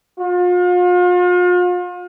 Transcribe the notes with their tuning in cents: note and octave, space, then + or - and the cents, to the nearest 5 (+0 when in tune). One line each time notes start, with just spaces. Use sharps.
F4 +40